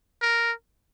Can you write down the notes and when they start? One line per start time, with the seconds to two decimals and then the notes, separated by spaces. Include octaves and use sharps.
0.22 A#4